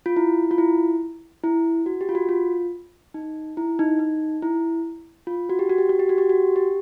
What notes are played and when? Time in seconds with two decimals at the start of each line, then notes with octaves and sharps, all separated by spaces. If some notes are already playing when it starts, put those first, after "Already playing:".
0.06 F4
0.16 E4
0.51 F4
0.58 E4
1.44 E4
1.86 F#4
2.01 G4
2.09 F4
2.15 F#4
2.29 F4
3.14 D#4
3.57 E4
3.79 D#4
3.99 D#4
4.42 E4
5.27 F4
5.50 F#4
5.59 G4
5.69 F#4
5.78 G4
5.89 F#4
5.99 G4
6.09 F#4
6.18 G4
6.29 F#4
6.56 G4